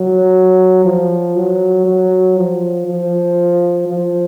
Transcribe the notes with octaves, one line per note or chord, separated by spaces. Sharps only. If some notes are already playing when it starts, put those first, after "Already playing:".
Already playing: F#3
F3
F#3
F#3
F3
F3
F3